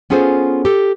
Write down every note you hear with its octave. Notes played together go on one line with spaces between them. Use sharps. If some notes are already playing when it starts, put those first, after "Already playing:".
B3 C#4 F4 G#4 A4 C5
G4 A4